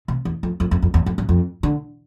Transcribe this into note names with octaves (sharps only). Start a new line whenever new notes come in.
C3
E2
F2
F2
F2
F2
E2
F2
G2
F2
D3